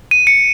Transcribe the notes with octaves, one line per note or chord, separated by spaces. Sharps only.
D#7
C#7